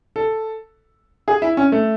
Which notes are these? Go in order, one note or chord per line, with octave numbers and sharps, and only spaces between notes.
A4
G#4
E4
C#4
A3